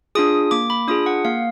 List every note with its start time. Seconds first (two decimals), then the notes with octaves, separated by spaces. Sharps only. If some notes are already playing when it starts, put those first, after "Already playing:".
0.15 D4 F4 G#4 D#6
0.51 A#3 D6
0.70 B5
0.88 D4 F4 G#4 D#6
1.06 F#5
1.25 A#3 F5